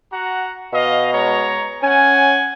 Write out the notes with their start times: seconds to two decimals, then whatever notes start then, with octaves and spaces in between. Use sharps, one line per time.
0.11 F#4 F#5 A#5
0.72 B2 D#5 F5
1.13 G#3 C#5 A#5
1.82 C#4 F#5 G#5